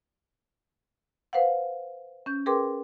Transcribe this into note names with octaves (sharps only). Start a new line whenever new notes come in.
B4 C5 F5 F#5
C#4 G6
G#4 A#4 B4 G5 C6 D6